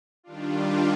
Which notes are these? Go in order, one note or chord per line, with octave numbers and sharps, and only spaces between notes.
D#3 G3 D4 F4